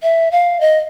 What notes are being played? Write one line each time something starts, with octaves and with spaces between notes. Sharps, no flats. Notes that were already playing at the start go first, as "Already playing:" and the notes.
E5
F5
D#5